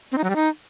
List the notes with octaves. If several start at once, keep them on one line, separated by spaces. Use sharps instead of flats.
C4
D#4
F#3
G3
D#4